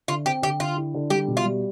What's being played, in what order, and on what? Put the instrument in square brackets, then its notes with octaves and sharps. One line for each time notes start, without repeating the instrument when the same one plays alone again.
[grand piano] D3 [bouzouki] F4
[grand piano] C4 [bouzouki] G4
[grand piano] D3 [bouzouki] G4
[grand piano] D3 [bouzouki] F4
[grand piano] E4
D3
[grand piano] G3 [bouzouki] G4
[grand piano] B2
[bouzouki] F4
[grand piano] G3